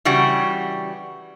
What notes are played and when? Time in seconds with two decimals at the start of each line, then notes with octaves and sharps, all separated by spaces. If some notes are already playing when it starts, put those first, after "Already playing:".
0.05 C#3 E3 G3 F#4